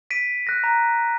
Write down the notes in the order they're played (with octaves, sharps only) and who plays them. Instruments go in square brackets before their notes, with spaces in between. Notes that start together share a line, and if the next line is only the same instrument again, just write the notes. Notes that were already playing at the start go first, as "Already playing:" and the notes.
[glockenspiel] B6 D7 D#7
F#6 A#6
A#5